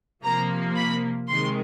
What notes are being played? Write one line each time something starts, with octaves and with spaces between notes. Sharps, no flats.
C3 F3 A#3 A#5
B5
C3 D#3 G#3 C6